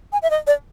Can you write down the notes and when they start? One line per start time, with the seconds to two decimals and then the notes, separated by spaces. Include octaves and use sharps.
0.12 G#5
0.22 E5
0.31 D#5
0.47 D5